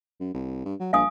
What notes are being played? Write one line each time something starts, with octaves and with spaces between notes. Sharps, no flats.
F#2
C2
G2
F#3
A#1 F5 G#5 D#6